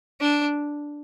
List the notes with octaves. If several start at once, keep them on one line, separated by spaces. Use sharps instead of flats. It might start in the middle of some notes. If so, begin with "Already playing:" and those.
D4